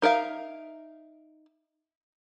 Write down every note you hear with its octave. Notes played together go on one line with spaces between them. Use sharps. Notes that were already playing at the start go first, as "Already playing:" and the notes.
D#4 A#4 E5 F5